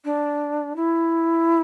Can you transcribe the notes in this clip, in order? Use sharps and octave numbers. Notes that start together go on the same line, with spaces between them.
D4
E4